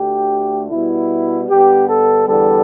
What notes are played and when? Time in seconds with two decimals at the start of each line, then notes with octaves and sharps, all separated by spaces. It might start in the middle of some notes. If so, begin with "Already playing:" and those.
Already playing: D2 D3 A3 G4
0.71 B2 G3 B3 E4
1.49 G2 D3 B3 G4
1.88 A4
2.28 E2 D3 G3 B3 A4